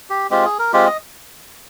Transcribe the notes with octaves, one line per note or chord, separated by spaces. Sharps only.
G4
G#3 C4 F4 G4
G#4
A#4
G#3 C4 F4 G4
D#5